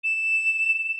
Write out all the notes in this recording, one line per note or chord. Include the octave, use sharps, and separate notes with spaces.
E7